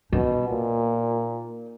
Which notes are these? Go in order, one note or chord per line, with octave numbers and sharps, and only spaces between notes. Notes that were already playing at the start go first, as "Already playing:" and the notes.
B2 D#4
A#2